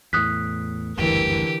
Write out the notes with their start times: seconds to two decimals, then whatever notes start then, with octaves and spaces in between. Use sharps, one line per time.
0.13 E2 A2 D#6 F#6 B6
0.97 F#1 D2 G2 D3 E3 G4 A#4